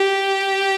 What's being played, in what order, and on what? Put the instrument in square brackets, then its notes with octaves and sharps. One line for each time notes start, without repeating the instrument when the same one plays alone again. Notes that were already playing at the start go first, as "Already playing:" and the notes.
Already playing: [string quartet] G4